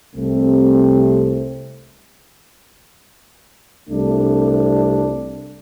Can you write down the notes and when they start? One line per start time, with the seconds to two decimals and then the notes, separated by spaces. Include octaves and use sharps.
0.15 C2 C3 A3 C4
3.90 C2 C3 A3 D4